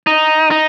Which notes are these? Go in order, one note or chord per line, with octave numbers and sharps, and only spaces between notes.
D#4
D#4